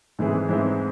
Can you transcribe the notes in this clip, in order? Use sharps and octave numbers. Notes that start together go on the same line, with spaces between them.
G#2 E3 C4 E4 G#4
G#2 E3 C4 E4 G#4